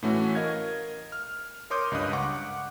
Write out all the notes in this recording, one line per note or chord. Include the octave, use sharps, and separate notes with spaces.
A2 E3 A3 C#4 F#4
A#4 D#5 F5 G#6
F6
A#4 C#5 C6 D6 D#6 G6
C#2 G2 D#5 D#6 F#6
F#5 C#6 D6